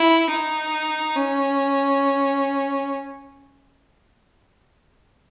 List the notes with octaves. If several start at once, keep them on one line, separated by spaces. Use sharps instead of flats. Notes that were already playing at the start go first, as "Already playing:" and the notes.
Already playing: E4
D#4
C#4